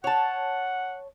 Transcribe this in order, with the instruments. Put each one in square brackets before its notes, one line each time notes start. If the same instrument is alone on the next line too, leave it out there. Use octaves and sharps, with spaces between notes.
[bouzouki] C#5 A5 [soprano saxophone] F#5